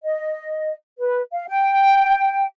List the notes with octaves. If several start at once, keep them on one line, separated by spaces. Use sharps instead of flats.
D#5
B4
F5
G5